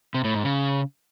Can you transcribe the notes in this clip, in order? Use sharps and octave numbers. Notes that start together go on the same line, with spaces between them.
C3
A2
G#2
C#3